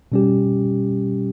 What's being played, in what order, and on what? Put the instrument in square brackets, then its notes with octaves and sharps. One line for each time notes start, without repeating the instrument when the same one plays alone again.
[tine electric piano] B2 G3 C#4 G4